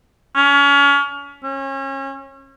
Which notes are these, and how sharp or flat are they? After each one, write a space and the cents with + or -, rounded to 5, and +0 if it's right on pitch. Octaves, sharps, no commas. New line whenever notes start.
C#4 +30
C#4 -30